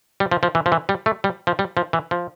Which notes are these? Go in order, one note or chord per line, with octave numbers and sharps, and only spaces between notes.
G3
F3
F3
E3
F3
E3
G3
A3
G3
F3
G3
F3
E3
F3